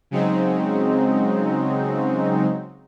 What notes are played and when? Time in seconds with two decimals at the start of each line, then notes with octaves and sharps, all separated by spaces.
0.11 C#3 F#3 G#3 C4 D#4